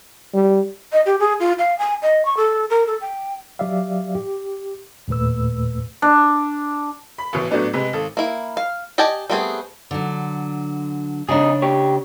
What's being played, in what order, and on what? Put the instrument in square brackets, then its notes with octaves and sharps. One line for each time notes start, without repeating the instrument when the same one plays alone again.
[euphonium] G3
[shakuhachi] D#5
G4
G#4
F4
F5
G#5
D#5
C#6
A4
A#4
A4
G5
[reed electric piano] F#3 G4 D5 E5 F5
G4
D#2 A#2 A3 B4 E6
[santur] D4
[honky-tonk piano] B5
A1 B2 E3
A2 F#3 A3 B3 D4
C3 G#3 B4
G#1 A4
[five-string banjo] A#3 E4
F5
G4 D5 D#5 G#5 A5
G3 A3 B3 C4 G#4
[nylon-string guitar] D3 F#3
[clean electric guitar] F2 D#4 G#4 [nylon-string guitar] C#3 D4
[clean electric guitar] G4 C#5